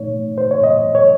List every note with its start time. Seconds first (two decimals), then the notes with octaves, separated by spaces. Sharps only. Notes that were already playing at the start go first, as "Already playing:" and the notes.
Already playing: A#2 A3 D#4 C#5
0.38 C5
0.51 C#5
0.64 D#5
0.95 C#5